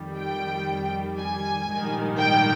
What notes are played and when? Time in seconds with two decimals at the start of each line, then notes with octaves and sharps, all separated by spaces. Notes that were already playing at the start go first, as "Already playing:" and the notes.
Already playing: F2 D#3 G3
0.18 G5
1.19 G#5
1.69 A#1 G#2 D#3 G3
2.19 G5